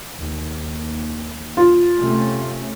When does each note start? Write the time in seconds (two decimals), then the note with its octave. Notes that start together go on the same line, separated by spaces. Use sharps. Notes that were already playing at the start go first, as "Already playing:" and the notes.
0.16 D#2
1.57 F4
1.99 C3 A3 C#4